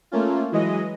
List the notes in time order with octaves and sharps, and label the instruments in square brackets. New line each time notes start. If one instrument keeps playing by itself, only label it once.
[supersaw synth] A3 A#3 C#4 F4
E3 F#3 G#3 D#5